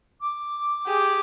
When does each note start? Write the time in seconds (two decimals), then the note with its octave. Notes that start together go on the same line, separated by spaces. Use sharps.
0.21 D6
0.86 G4 G#4